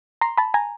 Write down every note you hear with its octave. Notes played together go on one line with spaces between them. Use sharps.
A#5 C6
A5 B5
G#5 A#5